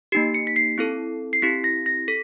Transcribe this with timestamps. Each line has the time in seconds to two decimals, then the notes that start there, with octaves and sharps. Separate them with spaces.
0.12 A#3 D#4 G4 C7
0.34 C#7
0.47 B6
0.56 C7
0.78 C4 E4 A4
1.33 C7
1.42 C4 E4 G4 B6
1.64 A#6
1.86 A#6
2.08 A4 B6